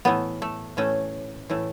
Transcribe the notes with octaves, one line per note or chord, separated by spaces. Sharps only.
A2 E3 A3 B3
A3
A2 E3 A3 C#4
A2 E3 A3